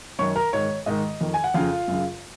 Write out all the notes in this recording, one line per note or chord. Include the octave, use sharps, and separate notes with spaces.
F#2 D#3 C#5 C#6
A#4 A#5
G#2 D#3 C#5
G#2 D#3 D#5
F2 D#3
G#5
F#5
F2 C#3 F4 F5
F#2 C#3